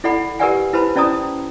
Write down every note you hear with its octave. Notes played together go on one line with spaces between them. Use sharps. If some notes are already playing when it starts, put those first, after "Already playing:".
E4 A4 D5 F#5 B5
G4 A#4 B4 D5 F#5 G#5
E4 B4 C5 A5 B5
C#4 E4 D5 A5 A#5 D#6